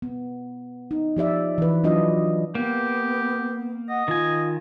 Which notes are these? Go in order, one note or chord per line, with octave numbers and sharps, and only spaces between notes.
B3
D#4
F3 G4 D5 E5
E3 B4
F#3 D4 F4 D#5
A#3 B3 G4
D#5 F#5
D#3 F4 G#5